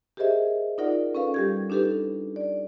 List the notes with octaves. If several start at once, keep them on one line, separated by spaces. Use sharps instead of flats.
G4 G#4 A#4 C5 D#5 E5
D#4 F4 A#4 D5 F#5
C#4 A4 B4 F5
G3 G4 G#6
D4 D#4 G4 A4 B4
D5